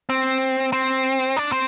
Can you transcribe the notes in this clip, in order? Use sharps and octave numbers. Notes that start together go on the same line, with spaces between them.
C4
C4
D4
C4